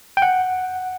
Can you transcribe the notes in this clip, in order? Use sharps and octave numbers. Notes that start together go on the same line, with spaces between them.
G5
F#5